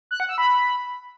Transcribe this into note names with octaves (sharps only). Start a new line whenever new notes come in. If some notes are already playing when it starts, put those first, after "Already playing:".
F#6
F#5
E6
B5